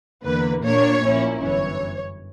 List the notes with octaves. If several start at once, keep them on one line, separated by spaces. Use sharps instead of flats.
E2 D3 A#3 B4
A#2 A#3 D4 C#5
A#1 A#2 A#3 C#4 E4
G1 F#2 E3 C#5